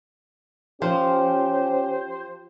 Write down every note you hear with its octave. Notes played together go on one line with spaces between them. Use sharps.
F3 C#4 G4 C5